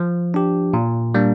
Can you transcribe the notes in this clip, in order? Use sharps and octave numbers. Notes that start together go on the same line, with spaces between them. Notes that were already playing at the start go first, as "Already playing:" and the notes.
Already playing: F3
D4 G4
A#2
G3 A#3 D4